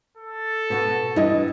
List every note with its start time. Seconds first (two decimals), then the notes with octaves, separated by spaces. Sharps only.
0.17 A4
0.70 B2 B3 F#4
1.16 G2 E3 E4 D#5